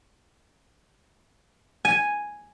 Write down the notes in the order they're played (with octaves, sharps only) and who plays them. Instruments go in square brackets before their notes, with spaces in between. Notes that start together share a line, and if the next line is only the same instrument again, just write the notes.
[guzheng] G#5